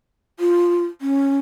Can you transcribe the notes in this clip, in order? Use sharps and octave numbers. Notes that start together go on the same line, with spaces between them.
F4
C#4